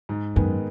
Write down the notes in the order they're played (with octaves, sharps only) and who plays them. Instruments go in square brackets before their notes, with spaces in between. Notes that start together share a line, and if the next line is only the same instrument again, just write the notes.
[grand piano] G#2
[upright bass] F#2 [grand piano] D#3 G#3 B3